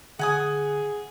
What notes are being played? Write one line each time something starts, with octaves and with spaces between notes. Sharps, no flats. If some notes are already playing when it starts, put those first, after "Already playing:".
D3 G#4 F#5 G#5 D#6